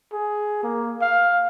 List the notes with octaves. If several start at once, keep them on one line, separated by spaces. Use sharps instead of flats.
G#4
A#3
F5